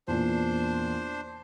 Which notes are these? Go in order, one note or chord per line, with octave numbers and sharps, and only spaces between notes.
E2 A#2 D4 C5